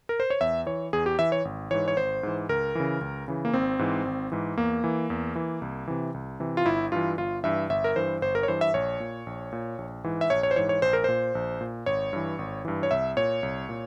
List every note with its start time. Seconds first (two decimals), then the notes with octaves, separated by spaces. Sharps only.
0.09 A#4
0.20 C5
0.30 C#5
0.41 E2 E5
0.66 E3 C#5
0.93 E2 G#4
1.06 G4
1.19 E3 E5
1.32 C#5
1.45 G#1
1.71 G#2 E3 C#5
1.88 C#5
1.97 G#1 C5
2.23 G#2 E3
2.49 C#2 A#4
2.75 C#3 E3
3.01 C#2
3.28 C#3 E3
3.45 A#3
3.53 G#1 C4
3.79 G#2 E3
4.05 G#1
4.32 G#2 E3
4.57 E2 A#3
4.84 E3
5.10 E2
5.36 E3
5.62 C2
5.88 C3 E3
6.14 C2
6.40 C3 E3
6.57 F4
6.66 G1 E4
6.92 G2 E3 F4
7.18 G1 F4
7.43 G2 E3 E5
7.70 G1 E5
7.84 A#4
7.96 G2 E3 C5
8.22 G1 C5
8.35 A#4
8.43 C#5
8.48 G2 E3 C5
8.61 E5
8.74 A#1 C#5
9.00 A#2
9.27 A#1
9.52 A#2
9.78 A#1
10.04 G#2 E3
10.21 E5
10.30 A#1 C#5
10.43 C#5
10.51 C5
10.56 G#2 E3 C#5
10.69 C#5
10.82 A#1 C5
10.93 A#4
11.04 A#2 C5
11.35 A#1
11.61 A#2
11.86 G#1 C#5
12.13 G2 E3
12.39 G#1
12.65 G2 E3
12.83 C#5
12.91 C2 E5
13.17 A#2 C#5
13.43 C2
13.69 A#2